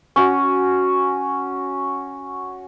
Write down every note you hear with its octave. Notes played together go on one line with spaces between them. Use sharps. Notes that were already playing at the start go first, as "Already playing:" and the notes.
C#4 F#4